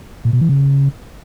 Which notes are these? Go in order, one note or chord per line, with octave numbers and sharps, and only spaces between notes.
A#2
B2
E3
C#3